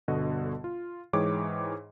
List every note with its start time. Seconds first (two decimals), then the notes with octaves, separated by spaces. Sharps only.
0.08 G1 B2 D3 F#4 D#5
0.64 F4
1.13 G#2 E3 G#4 C#5 G5 D6